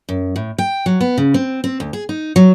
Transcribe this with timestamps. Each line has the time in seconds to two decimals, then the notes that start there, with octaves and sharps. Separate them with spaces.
0.09 F#2
0.36 A2
0.58 G5
0.86 F#3
1.01 B3
1.18 C#3
1.34 C4
1.64 C4
1.80 D2
1.93 G#4
2.09 D#4
2.36 F#3